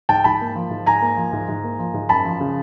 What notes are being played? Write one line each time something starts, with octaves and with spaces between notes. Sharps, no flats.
G#2 G5 A5
G#2 A5 B5
A#3
F3
G#2
G#2 G#5 A#5
A#3
F3
G#2
G#2
A#3
F3
G#2
F#2 A5 B5
F3
C#3